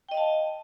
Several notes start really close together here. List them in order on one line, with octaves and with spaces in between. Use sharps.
G5 D#5 F5 A5